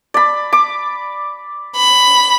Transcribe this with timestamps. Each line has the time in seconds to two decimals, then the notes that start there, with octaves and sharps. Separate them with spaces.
0.14 D5 B5
0.53 D6
1.76 B5